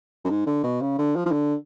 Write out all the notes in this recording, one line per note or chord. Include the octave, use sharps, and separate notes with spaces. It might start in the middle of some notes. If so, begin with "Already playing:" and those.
F#2
G#2
D3
B2
C#3
D3
F3
F3
D3